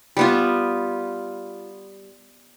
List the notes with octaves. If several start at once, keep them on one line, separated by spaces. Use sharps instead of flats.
G3 B3 F4